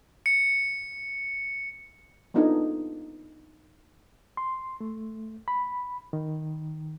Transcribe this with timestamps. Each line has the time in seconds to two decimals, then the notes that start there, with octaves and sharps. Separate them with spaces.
0.26 C#7
2.34 A#3 B3 D4 D#4 F4 A4
4.37 C6
4.81 A3
5.48 B5
6.13 D#3